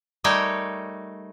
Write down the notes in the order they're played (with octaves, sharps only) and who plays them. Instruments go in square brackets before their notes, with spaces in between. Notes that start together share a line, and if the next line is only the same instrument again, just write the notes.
[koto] G3 A3 D#4 A#4 C#5 G5